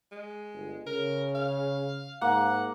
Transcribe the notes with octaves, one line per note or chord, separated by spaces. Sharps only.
G#3
G1
C#3 A#4
F5
G#2 A#3 F#5